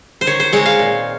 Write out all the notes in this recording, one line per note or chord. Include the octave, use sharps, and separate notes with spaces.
C5
D#3 C#5
C5
G#3 C4 D#4 C#5
F5
A#2